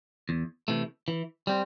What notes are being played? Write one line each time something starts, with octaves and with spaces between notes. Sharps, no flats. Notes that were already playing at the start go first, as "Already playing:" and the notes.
E2
C3 E3 A3
E3
G3 C4